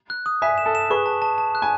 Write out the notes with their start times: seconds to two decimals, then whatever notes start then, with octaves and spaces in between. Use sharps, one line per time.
0.10 F#6
0.26 D#6
0.42 E5 G#5 B6
0.58 E7
0.66 A4
0.75 E7
0.90 G#4 B4 C#6
1.06 A5
1.22 A5
1.38 A5
1.55 F#6
1.62 G#5